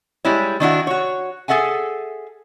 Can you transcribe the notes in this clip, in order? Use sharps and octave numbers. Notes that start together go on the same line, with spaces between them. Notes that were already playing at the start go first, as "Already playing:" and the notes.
G3 G#3 E4 C#5
D#3 D4 E4 F#4
F#4 C#5
G#4 A4 E5 F#5 G#5